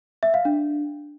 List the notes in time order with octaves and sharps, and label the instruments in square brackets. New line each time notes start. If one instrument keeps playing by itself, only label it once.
[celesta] E5
F5
D4